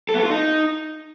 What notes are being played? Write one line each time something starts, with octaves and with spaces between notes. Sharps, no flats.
A4
B3
A4
F4
D#4